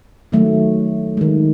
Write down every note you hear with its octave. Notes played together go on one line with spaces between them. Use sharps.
D#3 F#3 A3
D#3 G#3